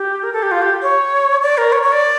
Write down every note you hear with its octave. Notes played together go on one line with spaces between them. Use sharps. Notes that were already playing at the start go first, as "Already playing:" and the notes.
Already playing: G4
A#4
A4
G4
F4
G4
C#5
D5
A#4
C#5
C#5
D5